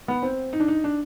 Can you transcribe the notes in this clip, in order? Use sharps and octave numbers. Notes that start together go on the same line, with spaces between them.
B3
C4
D#4
D4
D#4
D4